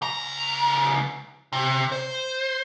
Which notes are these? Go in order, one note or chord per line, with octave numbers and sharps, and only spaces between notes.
C#2 A#5
C3
C5